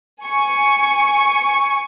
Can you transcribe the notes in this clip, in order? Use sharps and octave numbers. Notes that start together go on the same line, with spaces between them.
G#5 C#6